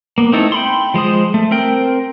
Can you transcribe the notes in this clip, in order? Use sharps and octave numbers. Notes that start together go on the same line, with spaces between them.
A#3 B3
A3 C4 D#4 E4 A4
G5 B5 C6
F3 G#3 C5 D#6
A3
C4 A#4 G5